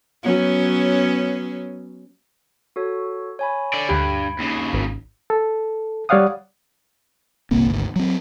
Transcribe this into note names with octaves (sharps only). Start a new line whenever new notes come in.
F#3 B3 C#4
F#4 A4 C#5
C#5 G#5 B5
D3 D5
D2 G2 G4 B5 G#6 D7
D#2 C#3
G#1
A4
G3 C#5 D5 F5 F#5 D#6
G1 C2 A#3 C4
G#1 D2
F#3 C4